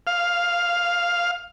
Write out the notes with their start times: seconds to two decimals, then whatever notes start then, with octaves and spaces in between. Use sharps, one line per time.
0.07 F5